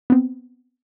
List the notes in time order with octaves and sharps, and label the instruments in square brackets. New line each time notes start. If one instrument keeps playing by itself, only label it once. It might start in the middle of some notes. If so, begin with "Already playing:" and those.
[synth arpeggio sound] B3 C4